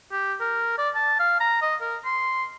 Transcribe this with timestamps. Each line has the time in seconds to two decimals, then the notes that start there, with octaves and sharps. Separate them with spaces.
0.12 G4
0.41 A#4
0.78 D5
0.95 A5
1.19 F5
1.40 A#5
1.62 D#5
1.81 A#4
2.05 C6